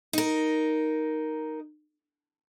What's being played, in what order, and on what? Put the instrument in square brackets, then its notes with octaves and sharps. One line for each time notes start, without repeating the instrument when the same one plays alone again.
[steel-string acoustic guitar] D#4 A#4